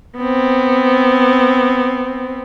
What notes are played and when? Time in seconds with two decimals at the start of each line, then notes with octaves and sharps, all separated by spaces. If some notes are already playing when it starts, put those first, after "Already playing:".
0.17 B3 C4